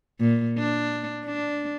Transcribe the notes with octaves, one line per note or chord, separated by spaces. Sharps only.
A#2
D4
D4